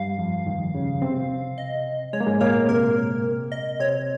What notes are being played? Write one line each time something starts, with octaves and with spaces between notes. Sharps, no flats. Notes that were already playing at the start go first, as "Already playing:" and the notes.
Already playing: G2 G3 F5
F2 F3
D#2 D#3
C#3
C3 C4
D#5
G#3 C#5
A#3
G#2 G#3
A#2 A#3 C#5
C3 C4 A#4
D#5
C3 C4 C#5